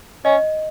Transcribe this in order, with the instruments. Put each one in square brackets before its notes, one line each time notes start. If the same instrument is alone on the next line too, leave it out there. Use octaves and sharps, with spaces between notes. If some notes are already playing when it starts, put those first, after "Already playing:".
[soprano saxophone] C#4 [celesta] D#5